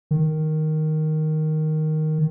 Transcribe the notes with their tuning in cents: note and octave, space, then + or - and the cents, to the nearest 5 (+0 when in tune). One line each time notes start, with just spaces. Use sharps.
D#3 +0